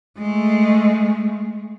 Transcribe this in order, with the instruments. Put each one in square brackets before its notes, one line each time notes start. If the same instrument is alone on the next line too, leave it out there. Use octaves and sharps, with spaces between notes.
[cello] G#3 A3